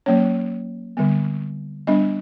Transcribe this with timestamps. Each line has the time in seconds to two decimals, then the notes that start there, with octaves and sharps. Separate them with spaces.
0.06 F#3 A#3 C#4 C#5
0.97 D3 G3 B3
1.87 G3 B3 D4 D#5